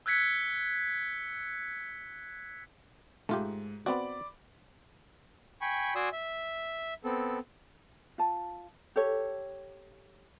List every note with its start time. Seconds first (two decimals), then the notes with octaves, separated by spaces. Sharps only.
0.06 E6 F#6 G#6 B6 C#7
3.29 G#2 A3 F4 G4
3.86 B3 C4 F#4 D5 B5
5.61 G5 G#5 B5 C#6
5.95 F#4 D5 G#5 C6 D#6 E6
6.12 E5
7.04 B3 C4 A4
8.18 F4 A5
8.96 G4 A4 C#5